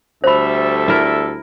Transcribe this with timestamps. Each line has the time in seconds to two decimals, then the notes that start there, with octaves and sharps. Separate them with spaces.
0.24 D2 G3 A4 C5 E5 B5
0.88 E4 A#4